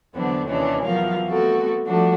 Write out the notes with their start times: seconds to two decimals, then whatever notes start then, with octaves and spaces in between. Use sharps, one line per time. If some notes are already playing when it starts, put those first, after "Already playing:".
0.14 E2 D3 F#3 B3 C4 D4
0.46 D#2 C3 D#3 E3 C#4 D4
0.84 E2 F3 F#3 A#4 F5
1.28 G3 A3 B3 C4 F#4 A4
1.86 F3 G3 A3 D4 F#4